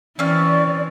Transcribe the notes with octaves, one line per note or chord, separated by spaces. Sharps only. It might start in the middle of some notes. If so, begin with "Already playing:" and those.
E3 C4 C#4 D5